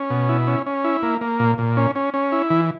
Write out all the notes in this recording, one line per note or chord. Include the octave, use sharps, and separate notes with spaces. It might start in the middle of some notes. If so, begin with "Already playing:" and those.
Already playing: C#4
B2
E4
C#4
C#4
E4
A#3
A#3
A#2
A#2
C#4
C#4
C#4
E4
E3